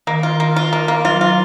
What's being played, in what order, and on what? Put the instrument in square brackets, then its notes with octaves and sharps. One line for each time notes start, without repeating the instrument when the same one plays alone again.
[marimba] D#3 [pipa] A#3
[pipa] F4
A#3
F4
A#3
A#3
[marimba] F#3 [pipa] F4
[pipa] F4